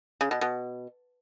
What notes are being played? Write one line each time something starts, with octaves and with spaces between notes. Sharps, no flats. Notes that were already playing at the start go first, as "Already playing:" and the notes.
C#3
B2
B2